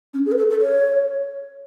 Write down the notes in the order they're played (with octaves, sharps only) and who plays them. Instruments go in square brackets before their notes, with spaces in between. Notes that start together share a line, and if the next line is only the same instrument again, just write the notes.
[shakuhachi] C#4
G#4
B4
A4
A4
C#5